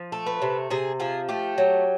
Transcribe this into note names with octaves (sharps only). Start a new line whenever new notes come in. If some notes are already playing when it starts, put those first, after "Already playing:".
Already playing: F3
A3
B4
C3
C3 G#4
F3 G#4
A3 G4
F#3